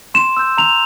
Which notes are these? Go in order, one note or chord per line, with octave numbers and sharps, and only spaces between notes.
C6 E7
E6 G6
A#5 F7